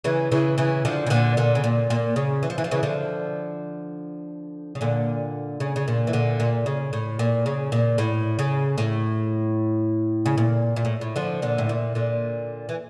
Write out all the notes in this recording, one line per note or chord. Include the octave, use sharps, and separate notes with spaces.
C#3 E3
C#3 E3
C#3 E3
D3 F3
C#3
A#2 D3
A#2 D3
C#3
A#2
A#2
C#3
E3
F3
E3
F3
C#3 E3
D3 F3
C#3
A#2 D3
C#3
C#3
A#2
E3
A#2 D3
A#2
C#3
A2
A#2
C#3
A#2
A2
C#3
A2
C#3
A#2
A#2
A2
A2
D3 F3
A#2 D3
A2
A#2
A#2 D3
E3